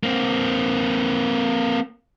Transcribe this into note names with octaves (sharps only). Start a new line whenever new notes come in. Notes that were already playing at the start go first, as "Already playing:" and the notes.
A#3 C4